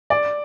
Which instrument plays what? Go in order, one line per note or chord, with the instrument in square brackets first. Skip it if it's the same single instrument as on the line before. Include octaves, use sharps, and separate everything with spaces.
[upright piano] D5